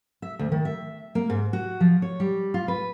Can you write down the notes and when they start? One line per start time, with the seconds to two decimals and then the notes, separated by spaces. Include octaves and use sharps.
0.22 E5
0.39 D2
0.52 D#3
0.65 E5
1.15 A#3
1.30 G#2
1.53 F#4
1.80 F3
2.02 C#5
2.20 G3
2.54 F4
2.68 B4